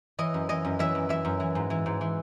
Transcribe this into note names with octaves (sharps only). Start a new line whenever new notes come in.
E3 D#5
F#2
E3 D#5
F#2
E3 E5
F#2
E3 E5
F#2
E3
G#2
E3
G#2
E3